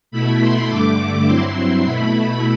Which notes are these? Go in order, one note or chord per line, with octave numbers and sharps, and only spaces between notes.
B2 A3 E4 B5
C6
G2 D3 A3 D6
G2 F#3 C4 E4 C6
B2 A3 E4 B5
B5